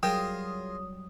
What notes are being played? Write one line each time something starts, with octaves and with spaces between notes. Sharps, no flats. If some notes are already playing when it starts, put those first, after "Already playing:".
F#3 G3 F4 G#4 A#4 G5 D#6